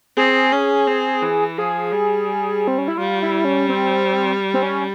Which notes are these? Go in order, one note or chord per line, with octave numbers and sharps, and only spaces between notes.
C4 G#4
C#4
C4
E3
F3 G#4
G3
C4
C#4
E4
G3 F4
E4
C#4
C4
C4
C#4